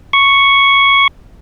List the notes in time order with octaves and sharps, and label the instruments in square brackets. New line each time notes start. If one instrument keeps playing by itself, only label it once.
[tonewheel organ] C#6